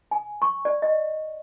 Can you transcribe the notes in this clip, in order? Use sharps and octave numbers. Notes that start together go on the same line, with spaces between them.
G#5
C#6
D5
D#5